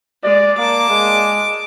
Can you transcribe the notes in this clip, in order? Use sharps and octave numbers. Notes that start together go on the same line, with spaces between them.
G#3 D5
A#3 A5 D6
G#3